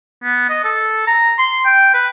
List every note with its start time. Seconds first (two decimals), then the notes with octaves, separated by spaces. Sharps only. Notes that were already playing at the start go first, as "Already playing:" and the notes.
0.23 B3
0.50 D#5
0.65 A4
1.08 A#5
1.39 C6
1.65 G5
1.94 B4